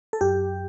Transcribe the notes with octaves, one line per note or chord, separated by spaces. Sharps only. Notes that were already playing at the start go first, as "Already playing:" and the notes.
A4
F#2 G4